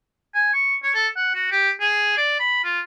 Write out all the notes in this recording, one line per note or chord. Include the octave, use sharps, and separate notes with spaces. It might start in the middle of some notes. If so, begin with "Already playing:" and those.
G#5
C#6
C#5
A4
F#5
F#4
G4
G#4
D5
B5
F4